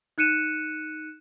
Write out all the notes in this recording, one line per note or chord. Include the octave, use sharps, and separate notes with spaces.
D#4 F#6 C#7 D#7 E7